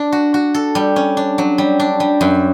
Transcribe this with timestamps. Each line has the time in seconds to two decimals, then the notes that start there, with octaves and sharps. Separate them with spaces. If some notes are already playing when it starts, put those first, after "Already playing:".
Already playing: D4
0.12 F#4
0.34 F#4
0.54 A4
0.75 G3
0.96 C#4
1.17 D4
1.38 F#3
1.58 G3
1.80 D4
2.00 G3
2.21 F#2